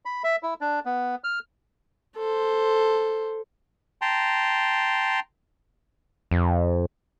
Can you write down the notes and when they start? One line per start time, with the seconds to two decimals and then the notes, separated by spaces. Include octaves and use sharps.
0.05 B5
0.24 E5
0.43 E4
0.61 D4
0.85 B3
1.24 F6
2.16 A4 C5
4.02 G5 A5 A#5 C6
6.31 F2